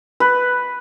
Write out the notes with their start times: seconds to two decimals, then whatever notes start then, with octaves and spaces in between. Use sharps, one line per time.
0.20 B4